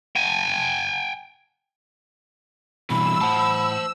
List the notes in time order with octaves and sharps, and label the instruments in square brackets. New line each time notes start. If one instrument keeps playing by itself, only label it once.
[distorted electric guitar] G5 G#5
[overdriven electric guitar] G2 E3 [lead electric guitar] B2 [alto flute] B5 [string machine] E6
[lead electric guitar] A2 F#5 [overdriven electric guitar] C5 A5